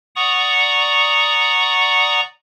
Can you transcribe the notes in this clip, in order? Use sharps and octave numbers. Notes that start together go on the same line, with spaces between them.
D5 F#5 A#5 C#6 D#6